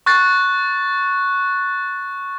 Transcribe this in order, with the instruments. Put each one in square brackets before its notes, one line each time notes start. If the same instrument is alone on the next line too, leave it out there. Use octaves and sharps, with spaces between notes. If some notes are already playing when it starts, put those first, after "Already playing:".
[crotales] C#6 F#6 A6